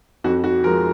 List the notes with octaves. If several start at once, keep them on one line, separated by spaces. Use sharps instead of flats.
F2 F#4
F#4
F3 G#3 A#4